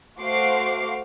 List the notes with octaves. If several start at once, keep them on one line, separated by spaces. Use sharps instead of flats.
A3 F#4 C5 F5 D6 C7